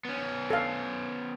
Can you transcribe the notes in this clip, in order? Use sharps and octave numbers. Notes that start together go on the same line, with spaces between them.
B3 C#4
A4 F5